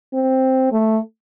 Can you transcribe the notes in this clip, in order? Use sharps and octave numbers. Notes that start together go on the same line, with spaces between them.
C4
A3